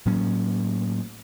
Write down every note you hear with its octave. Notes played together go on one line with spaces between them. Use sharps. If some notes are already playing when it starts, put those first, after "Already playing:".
A2 F#3 A#3 C#4